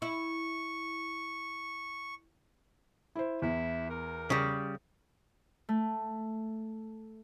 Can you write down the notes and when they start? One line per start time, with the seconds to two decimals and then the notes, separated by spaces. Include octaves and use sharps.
0.02 E4 C#6
3.15 E4 C5
3.42 E2 E4
3.90 A#4
4.30 C#3 G3
5.69 A3